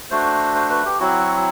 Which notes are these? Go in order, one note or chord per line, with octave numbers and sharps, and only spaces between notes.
A3 D4 F#4 C5
C5
B4
G4
F#3 C4 E4 F#4